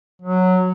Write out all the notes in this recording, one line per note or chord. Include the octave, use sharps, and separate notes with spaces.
F#3